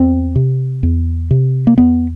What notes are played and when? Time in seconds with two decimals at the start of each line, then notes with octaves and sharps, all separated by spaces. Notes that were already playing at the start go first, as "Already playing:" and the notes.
Already playing: E2 C4
0.36 C3
0.83 E2
1.31 C3
1.67 A#3
1.78 E2 B3